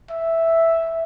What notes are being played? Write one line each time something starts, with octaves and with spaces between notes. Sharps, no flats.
E5